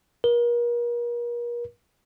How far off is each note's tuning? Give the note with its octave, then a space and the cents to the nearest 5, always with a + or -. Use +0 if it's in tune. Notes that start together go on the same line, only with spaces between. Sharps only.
A#4 +40